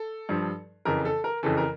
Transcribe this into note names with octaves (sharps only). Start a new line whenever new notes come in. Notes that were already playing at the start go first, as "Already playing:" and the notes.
Already playing: A4
G2 F3
F2 C#3 E3 A#4
A4
A#4
F2 C#3 E3 A4
A#4